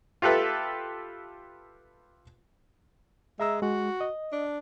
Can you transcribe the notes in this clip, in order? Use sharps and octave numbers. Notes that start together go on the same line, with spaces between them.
F4 G4 A4 B4 E5
G#3 E5 A#5 E6
G#3 F#4
D#5
D4